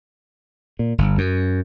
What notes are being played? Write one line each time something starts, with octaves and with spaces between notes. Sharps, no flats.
A#2
G1
F#2